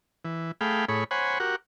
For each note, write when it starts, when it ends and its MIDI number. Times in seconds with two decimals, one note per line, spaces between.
0.25 0.52 52
0.61 0.85 57
0.61 0.85 68
0.61 0.85 77
0.61 0.85 79
0.61 0.85 83
0.89 1.04 45
0.89 1.04 68
0.89 1.04 73
0.89 1.04 83
1.11 1.39 72
1.11 1.39 73
1.11 1.39 78
1.11 1.39 80
1.11 1.39 83
1.40 1.56 66
1.40 1.56 67
1.40 1.56 70
1.40 1.56 78